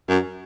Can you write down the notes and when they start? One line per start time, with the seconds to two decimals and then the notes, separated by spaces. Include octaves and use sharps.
0.08 F#2